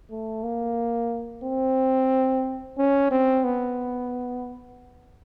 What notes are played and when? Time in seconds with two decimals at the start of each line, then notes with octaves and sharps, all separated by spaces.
0.11 A3
0.44 A#3
1.44 C4
2.78 C#4
3.11 C4
3.44 B3